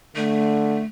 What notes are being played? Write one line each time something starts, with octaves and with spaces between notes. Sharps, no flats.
D3 A3